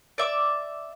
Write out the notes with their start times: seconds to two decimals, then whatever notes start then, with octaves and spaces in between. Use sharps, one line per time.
0.18 D5 E5 D6